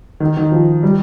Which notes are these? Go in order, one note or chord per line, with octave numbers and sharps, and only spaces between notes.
D#3
D#3
F3
G3